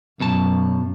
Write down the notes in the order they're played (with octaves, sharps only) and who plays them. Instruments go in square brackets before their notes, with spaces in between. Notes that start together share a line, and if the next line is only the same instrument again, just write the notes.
[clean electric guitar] B1 B2 A5 [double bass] F#2